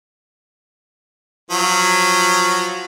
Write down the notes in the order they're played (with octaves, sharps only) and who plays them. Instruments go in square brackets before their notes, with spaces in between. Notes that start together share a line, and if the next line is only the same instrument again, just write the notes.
[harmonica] F3 F#3